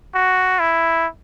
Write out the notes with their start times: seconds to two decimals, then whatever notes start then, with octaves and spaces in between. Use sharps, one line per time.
0.14 F#4
0.59 E4